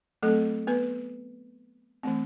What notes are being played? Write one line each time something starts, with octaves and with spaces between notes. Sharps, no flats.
F#3 A3 C4 A4
B3 B4
E3 A3 C4